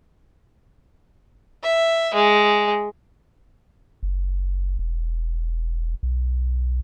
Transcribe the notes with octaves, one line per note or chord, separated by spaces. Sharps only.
E5
G#3
F#1
E1
B1